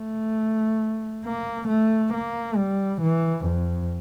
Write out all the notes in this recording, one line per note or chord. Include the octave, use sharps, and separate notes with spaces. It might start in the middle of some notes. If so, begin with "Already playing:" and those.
Already playing: A3
A#3
A3
A#3
G3
E3
F2